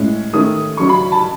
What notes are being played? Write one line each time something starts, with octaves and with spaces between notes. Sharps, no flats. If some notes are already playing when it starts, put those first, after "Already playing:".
Already playing: A2 G#3 C#4
D#3 A3 C#4 D#6
C#3 F#3 C#4 C#6
B5
A5